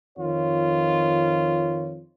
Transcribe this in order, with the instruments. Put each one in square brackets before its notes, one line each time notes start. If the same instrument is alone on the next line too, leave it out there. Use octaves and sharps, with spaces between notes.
[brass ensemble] F2 D#3 F4 C#5